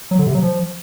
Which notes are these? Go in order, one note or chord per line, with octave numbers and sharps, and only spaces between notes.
F#3
D3
C3
F#3
F3